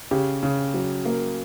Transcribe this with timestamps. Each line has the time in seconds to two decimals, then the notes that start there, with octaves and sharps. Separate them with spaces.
0.11 C#3 G4
0.43 C#3
0.74 F#3
1.05 A#3